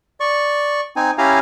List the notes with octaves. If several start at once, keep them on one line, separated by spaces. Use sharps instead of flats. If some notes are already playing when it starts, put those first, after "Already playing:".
D5 C#6
C4 D#4 G#5
C#4 E4 G4 F5 G#5 A#5